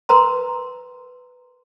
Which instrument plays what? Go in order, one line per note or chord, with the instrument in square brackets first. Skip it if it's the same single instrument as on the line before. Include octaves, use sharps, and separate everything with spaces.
[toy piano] A#4 B4 A#5 C6